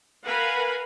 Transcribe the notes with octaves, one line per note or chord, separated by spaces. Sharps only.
A#4 B4 F5 F#5 G#5 B5